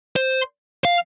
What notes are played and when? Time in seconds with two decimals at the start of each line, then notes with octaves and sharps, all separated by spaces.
0.16 C5
0.85 F5